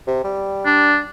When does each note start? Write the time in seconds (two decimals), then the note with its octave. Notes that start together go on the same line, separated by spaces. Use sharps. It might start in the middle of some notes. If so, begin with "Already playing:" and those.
0.07 C3
0.24 G3
0.66 D4